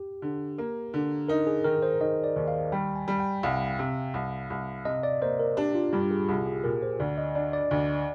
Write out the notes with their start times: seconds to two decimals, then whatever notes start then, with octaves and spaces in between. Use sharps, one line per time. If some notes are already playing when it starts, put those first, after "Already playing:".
Already playing: G4
0.22 D3
0.58 A#3
0.94 D3
1.28 D#4 A#4
1.47 G#4
1.64 D#3 A#4
1.83 C5
2.00 D#3 D#5
2.24 D5
2.36 D#2
2.48 F5
2.72 G3 G5
2.96 G#5
3.08 G3
3.20 G5
3.43 C2 F5
3.79 C3
4.14 C2
4.50 C2
4.85 C3 D#5
5.03 D5
5.21 A#3 C5
5.39 A#4
5.57 D4 G4
5.75 F4
5.93 G2 G4
6.11 G#4
6.28 C2 G#4
6.46 G#4
6.64 A#2 A#4
6.82 C5
7.00 D2 D5
7.18 D#5
7.35 D4 D5
7.53 D5
7.71 D2